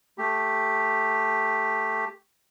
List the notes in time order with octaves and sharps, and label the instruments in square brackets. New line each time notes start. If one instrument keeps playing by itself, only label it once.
[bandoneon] A3 G4